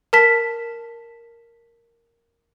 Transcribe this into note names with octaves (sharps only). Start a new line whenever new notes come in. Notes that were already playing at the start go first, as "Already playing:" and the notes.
A#4 A5 B6